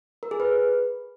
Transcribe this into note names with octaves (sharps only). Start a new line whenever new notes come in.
A#4
G#4
B4